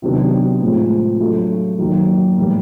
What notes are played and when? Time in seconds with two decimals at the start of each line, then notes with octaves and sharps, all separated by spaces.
0.02 C3 D#3 F#3 B3 D4
0.61 A2 F3 G#3 C4
1.20 F#3 A3 D4 F4
1.79 F#2 D#3 F#3 A#3
2.37 A2 E3 G3 A#3